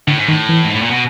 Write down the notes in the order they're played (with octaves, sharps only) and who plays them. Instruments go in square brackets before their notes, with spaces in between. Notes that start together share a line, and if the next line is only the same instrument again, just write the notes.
[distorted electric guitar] A2 [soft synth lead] D3
[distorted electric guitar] G#2
[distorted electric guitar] A2 [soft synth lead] D#3
[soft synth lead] E3
[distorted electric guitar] G#2
A2
A#2
B2